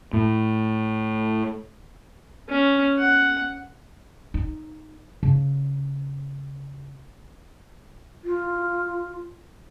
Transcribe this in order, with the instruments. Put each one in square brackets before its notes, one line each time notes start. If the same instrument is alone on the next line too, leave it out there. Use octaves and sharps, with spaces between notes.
[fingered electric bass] A2
[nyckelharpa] C#4
F#5
[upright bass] D#4
C#3
[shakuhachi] F4